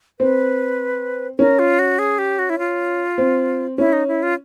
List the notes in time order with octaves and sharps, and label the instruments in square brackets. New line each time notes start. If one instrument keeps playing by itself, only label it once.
[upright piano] C4 [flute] B4
[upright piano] C#4 [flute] A#4
[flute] F4
F#4
G#4
G4
F#4
E4
F4
[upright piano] C4
[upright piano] C#4 [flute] E4
[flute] D#4
E4
F4